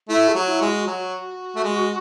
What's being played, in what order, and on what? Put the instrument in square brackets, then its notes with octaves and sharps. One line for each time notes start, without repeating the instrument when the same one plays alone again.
[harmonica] A3 [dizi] E4
[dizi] G#4
[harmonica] F#3 [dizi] F#4
[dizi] E4
[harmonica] G#3
[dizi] F#4
[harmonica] F#3 [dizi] F#4
[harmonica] A3
G#3